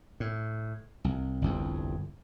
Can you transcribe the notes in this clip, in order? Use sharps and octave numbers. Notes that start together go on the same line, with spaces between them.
A2
C2
G1 C2 F2